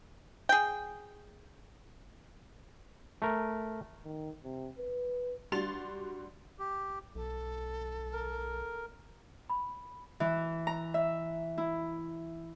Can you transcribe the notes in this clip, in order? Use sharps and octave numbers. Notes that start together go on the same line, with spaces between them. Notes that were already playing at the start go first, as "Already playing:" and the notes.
G#4 G5
A3 A#4
D#3
C3
B4
G3 D4 F#4 C6 A6 F7
G4
B1 A4
A#4
B5
E3
A#5
E5
E4